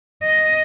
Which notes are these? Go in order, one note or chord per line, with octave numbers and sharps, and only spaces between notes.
D#5